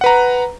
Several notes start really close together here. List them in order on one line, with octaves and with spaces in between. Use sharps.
F#5 B4 A#5